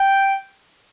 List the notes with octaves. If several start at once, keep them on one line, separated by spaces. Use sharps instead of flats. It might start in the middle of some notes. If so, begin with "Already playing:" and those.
Already playing: G5